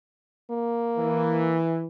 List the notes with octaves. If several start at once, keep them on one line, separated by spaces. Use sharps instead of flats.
A#3
E3